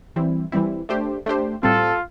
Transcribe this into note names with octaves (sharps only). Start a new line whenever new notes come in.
E3 G3 C4 E4
E3 G3 C4 E4
A3 D4 G4 C5
A3 D4 G4 C5
A2 G3 C4 F4 A4